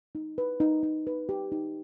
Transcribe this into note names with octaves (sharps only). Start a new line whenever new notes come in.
D#4
B4
D#4
D#4
B4
G4
D#4